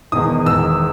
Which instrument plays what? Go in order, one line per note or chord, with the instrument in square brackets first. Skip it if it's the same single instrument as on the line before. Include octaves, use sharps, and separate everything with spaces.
[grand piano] E1 E2 D#3 D#6
E1 E2 D#3 E6